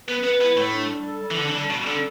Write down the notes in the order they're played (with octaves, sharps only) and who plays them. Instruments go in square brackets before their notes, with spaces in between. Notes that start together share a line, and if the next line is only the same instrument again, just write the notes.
[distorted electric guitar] B3 [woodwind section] B4
[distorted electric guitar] B3 [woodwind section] B4
[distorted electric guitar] B3 [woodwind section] E4
[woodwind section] A2 [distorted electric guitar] A3
[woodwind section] D4
G3
A4
G3
[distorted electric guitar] E3
[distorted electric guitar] D3 [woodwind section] D4
[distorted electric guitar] E3
[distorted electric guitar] D3 [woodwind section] G3
[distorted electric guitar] B2 [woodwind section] G3
[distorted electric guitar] D3 [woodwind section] A4